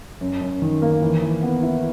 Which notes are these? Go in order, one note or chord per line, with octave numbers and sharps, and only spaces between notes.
F#2
F#2
D#3
A#3
E3
E3
B3
E4